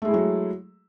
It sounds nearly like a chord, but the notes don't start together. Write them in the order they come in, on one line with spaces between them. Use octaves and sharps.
A3 G#3 E4 G#4 F#3